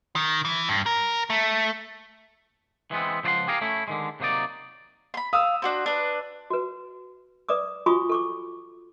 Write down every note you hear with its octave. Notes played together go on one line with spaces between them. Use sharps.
D#3
E3
G2
A#4
A3
E3 G#3 B3 C4
C#2 F3 C5 D5 F#5 C6
G4 G#4 A#4 F5
A3 C#4 E4
D3 D#3 G#3
C3 F#3 A#3 D#4 D5
B5 C6
F5 D#6 E6
D4 F#4 C5
D4 B4
F#4 B4
B4 D5 D6 D#6
F4 F#4 G#5 B5 C#6 D#6
A4 C#6 D6